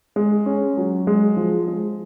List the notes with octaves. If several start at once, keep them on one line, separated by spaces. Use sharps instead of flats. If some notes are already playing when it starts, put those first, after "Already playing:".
G#3
C#4
F#3
G#3
F3
G#3